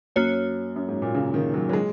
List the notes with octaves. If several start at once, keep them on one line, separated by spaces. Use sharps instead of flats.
F#2 A#3 F#4 C#5
F#2
G#2
A#2
C#3
D#3
F#3
F#3
G#3